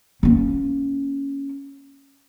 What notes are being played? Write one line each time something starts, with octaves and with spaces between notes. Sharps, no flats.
A#3 C#4